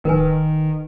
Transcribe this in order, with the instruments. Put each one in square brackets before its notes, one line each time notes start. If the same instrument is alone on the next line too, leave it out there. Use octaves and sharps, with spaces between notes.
[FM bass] D1 [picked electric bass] D#3 [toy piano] A#4 B4 G#5